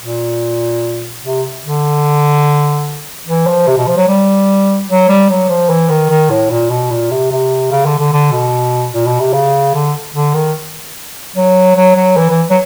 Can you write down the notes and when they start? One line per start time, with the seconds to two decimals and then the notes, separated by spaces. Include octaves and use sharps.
0.03 A#2
1.24 C3
1.64 D3
3.27 E3
3.46 F3
3.67 C3
3.77 B2
3.87 F3
3.97 F#3
4.07 G3
4.88 F#3
5.09 G3
5.29 F#3
5.49 F3
5.69 E3
5.89 D#3
6.09 D#3
6.30 A2
6.50 A#2
6.70 B2
6.91 A#2
7.11 C3
7.31 C3
7.71 C#3
7.85 D3
7.98 D3
8.12 D3
8.32 B2
8.93 A#2
9.06 B2
9.20 C3
9.33 C#3
9.74 D3
10.14 D3
10.34 D#3
11.36 F#3
11.75 F#3
11.96 F#3
12.16 E3
12.30 E3
12.50 F#3